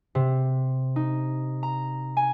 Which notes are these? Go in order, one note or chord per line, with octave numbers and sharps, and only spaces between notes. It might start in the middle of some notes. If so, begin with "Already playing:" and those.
C3
D#4
A#5
G#5